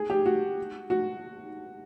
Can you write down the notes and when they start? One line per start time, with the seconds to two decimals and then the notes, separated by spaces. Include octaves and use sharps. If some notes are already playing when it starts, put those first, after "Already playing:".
Already playing: G#4
0.10 G4
0.26 F#4
0.90 F#4